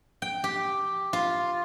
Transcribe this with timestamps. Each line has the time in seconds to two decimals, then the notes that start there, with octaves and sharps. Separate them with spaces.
0.22 G5
0.44 G4
1.13 F4